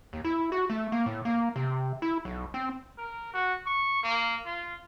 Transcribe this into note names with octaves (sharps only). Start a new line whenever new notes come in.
D#2
E4
F#4
A3
A#3
A2
A#3
C3
E4
B1
C4
A#4
F#4
C#6
A#3
F4